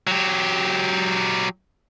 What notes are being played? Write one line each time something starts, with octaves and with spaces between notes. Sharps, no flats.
F#3 G4